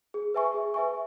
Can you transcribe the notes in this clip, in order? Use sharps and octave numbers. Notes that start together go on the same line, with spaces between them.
G#4
B4 E5 G#5 C#6
G#4
B4 E5 G#5 C#6